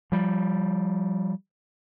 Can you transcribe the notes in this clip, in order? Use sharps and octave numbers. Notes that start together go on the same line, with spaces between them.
F3 G3